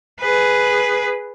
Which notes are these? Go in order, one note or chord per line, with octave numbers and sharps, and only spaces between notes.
G#4 B4